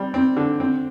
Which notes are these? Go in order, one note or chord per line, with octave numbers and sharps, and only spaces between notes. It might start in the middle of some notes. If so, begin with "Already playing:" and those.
Already playing: G3 C4
C4
D3
C4